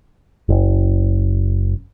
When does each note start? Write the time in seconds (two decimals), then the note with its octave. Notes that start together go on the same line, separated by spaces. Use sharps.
0.49 F#1